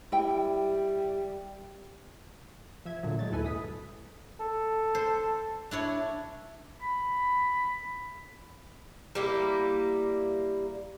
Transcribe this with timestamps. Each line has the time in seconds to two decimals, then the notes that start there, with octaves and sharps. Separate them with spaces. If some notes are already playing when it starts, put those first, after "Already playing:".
0.12 G3 E4 G5
2.85 F3 E5 G#6
3.03 A#2 D3 F#3
3.19 G#3 A3 A6
3.31 D#2 G#2 E4 A4 B4 G#5
3.43 F#2 D#6 B6
4.40 A4
4.95 C5
5.71 D4 E4 C#5
6.82 B5
9.15 G3 A#3 E4